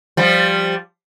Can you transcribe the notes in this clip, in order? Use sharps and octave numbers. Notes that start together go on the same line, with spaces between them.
F3 G3